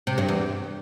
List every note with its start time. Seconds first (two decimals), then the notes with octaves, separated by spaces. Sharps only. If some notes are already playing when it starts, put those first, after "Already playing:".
0.07 C3
0.18 G2
0.28 E2